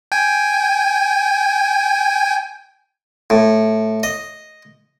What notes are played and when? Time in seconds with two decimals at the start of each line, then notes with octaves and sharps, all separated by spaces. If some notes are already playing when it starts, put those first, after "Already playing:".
0.12 G5 G#5
3.30 A2
4.03 D#5